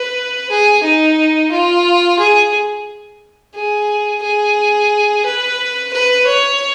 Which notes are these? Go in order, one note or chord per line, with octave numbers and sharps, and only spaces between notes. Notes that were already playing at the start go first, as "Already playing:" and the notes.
Already playing: B4
G#4
D#4
F4
G#4
G#4
G#4
B4
B4
C#5